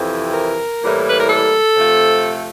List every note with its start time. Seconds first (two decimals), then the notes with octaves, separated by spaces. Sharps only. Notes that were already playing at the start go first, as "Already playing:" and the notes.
Already playing: F2 C3 E3
0.34 A#4
0.81 A2 E3 G3 A#3
1.09 B4
1.19 A#4
1.29 A4
1.76 C3 F3 A3